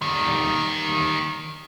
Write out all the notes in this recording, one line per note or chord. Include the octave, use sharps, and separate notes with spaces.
D#3 G3